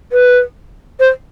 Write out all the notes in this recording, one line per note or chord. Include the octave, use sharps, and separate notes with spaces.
B4
C5